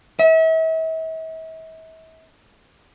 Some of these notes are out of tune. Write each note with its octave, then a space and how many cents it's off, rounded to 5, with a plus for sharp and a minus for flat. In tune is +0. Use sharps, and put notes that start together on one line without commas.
E5 -40